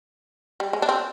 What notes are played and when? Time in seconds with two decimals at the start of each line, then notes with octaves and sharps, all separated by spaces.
0.60 G3
0.73 G#3
0.82 D4
0.89 C4